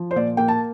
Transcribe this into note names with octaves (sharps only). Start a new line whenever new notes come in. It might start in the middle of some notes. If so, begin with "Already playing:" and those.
Already playing: F3
C5
A#2 D5
A#3 G5
A5